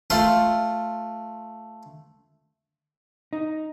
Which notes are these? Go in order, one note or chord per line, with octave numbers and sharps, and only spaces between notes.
A3 F4 C5
D#4